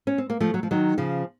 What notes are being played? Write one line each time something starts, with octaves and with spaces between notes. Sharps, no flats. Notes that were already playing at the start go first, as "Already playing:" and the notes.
C#4
C4
A#3
F3 A3
F#3
F3
D#3 F#3
C#3 F3